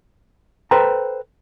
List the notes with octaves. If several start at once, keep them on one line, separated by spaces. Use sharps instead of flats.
A4 B4 C5 G5 A#5